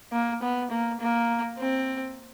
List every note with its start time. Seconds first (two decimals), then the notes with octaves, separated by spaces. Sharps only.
0.12 A#3
0.42 B3
0.71 A#3
1.00 A#3
1.59 C4